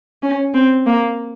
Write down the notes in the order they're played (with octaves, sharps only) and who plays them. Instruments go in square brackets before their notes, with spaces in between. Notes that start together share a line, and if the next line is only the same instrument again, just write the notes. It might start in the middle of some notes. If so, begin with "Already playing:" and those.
[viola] C#4
C4
A#3